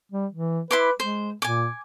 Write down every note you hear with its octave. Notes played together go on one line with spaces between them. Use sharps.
G3
E3
E4 B4 C6 D6
G#3 C5
A#2 G#5 D6